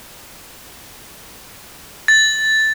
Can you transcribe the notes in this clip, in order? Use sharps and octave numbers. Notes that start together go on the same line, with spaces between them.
A6